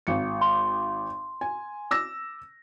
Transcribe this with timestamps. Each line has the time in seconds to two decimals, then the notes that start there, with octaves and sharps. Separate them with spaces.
0.07 G#1 C#7
0.41 C6
1.41 G#5
1.91 D6 E6 A#6